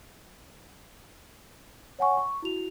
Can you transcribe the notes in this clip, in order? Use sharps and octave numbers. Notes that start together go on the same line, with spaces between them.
C#5 F#5 G#5 C#6
C#6
E4 F#4 F7